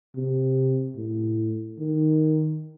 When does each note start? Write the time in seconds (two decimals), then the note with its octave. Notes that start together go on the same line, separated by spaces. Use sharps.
0.16 C3
0.96 A2
1.79 D#3